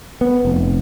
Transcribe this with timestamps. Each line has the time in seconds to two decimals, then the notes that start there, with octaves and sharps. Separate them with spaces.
0.21 B3
0.45 F1